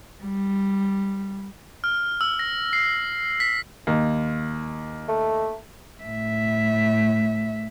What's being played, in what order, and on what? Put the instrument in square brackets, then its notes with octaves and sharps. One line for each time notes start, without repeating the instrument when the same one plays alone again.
[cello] G3
[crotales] F6
E6
A#6
C7
B6
[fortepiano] D#2
[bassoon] A3
[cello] A2 E5